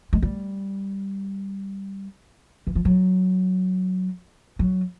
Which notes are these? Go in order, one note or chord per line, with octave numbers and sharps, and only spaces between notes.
G#3
G3
E3
F3
F#3
F#3